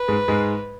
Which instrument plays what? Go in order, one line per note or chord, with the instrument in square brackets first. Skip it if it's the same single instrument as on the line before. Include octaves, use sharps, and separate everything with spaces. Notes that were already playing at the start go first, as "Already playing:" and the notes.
Already playing: [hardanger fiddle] B4
[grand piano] G#2 G#3
G#2 G#3